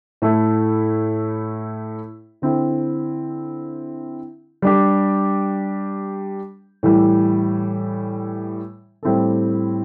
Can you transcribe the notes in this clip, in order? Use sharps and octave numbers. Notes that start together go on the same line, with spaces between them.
A2 A3 E4
D3 C4 E4
G3 D4 G4
A2 E3 G3
A2 G3 C4 E4 A4